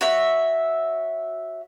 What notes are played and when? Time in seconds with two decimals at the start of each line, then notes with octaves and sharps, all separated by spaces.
0.01 F#4 C#5 E5